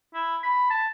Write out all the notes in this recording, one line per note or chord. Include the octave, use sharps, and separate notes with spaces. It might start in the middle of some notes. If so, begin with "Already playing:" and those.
E4
B5
A5